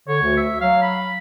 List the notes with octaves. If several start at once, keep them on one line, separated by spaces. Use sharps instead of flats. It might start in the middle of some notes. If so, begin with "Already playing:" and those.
D3 C#5
D2
E5
F#3 F5
B5